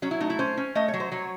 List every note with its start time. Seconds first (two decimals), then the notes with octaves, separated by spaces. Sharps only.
0.02 F#3 C#4
0.11 E4
0.20 A3 D#4
0.30 E4
0.39 C#4 C5
0.57 C#4
0.75 A3 D#5
0.88 C#5
0.94 F#3
1.00 C5
1.12 F#3 C#5